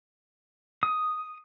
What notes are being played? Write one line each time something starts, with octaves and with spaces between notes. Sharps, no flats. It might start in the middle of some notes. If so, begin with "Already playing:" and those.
D#6